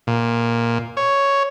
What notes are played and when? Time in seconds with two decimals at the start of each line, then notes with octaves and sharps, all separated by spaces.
0.07 A#2
0.97 C#5